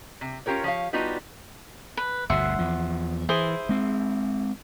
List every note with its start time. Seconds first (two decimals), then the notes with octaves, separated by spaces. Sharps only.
0.21 C3
0.46 C#4 F4 G4 A#4 C#5
0.64 F3 C#5 F5
0.93 G3 B3 D4 D#4 F4 F#4
1.97 B4
2.30 G1 D2 B2 E5 F#5 C6
2.59 E2 F3
3.29 E3 E4 G#4 C5
3.69 G#3 C4